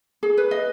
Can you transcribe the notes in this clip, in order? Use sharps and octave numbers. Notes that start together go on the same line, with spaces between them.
G#4
B4
D#5